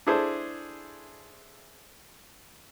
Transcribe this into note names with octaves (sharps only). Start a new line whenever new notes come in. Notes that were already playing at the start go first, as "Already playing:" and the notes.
D4 E4 G#4 A4 C5